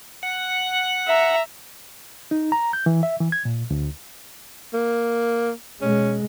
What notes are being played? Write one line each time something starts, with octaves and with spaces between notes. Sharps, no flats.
F#5
E5 A#5
D#4
A#5
G6
E3
E5
E3
G#6
A#2
D2
A#3
B2 G#3 C#4